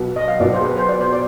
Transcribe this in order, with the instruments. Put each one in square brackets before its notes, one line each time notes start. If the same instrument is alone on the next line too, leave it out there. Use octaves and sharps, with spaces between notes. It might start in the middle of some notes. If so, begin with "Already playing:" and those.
Already playing: [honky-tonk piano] B1 B2 B3
[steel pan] D#5
F5
[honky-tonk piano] B1 B2 B3 F4 [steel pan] D5
[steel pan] C5
G#4
B4
C5
D5
C5
D5